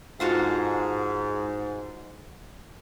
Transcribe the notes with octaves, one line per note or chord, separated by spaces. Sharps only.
G#2 F4 F#4 A4